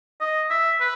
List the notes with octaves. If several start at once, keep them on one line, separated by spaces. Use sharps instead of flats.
D#5
E5
B4